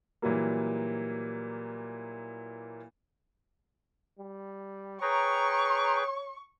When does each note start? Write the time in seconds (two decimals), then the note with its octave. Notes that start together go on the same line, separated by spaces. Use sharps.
0.22 A#2 E3 F#3 G3 A#3
4.19 G3
5.02 G#4 B4 C#5 G5 A#5 C#6